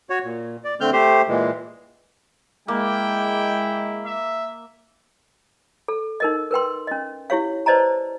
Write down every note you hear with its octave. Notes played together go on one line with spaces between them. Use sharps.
F#4 C#5
A#2
D5
D3 A3 C4 F6 G6
A3 G4 C5
A#2 E3 G#3
G#3 A#3 E4 G5
E5
A4
D#4 A#4 D#5
A#4 B4 G5 C6
C#4 D#5
E4 G4 C#5 F5
B4 C5 D5 D#5 A5 A#5